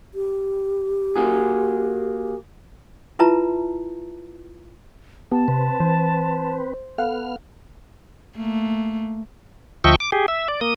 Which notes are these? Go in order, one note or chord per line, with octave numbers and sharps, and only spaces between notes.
G4
A#3 F#4 G#4
E4 F4 B4 E5 A5 A#5
B3 G4 A5
C3 C4 B4
E3 C5
B3 A4 F5 F#5 F6
A3 A#3
D2 F3 D#5 E5 G5 C#6
D6
G4 G#4
E5
D5
A#3 D#6